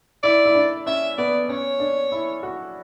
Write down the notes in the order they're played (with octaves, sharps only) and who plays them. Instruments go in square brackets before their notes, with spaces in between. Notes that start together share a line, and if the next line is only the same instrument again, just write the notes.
[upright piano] E4 [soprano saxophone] D5
[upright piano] E4
D4
[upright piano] C#4 [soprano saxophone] E5
[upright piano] B3 [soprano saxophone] D5
[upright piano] C#4 [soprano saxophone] C#5
[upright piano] D4
E4
F#4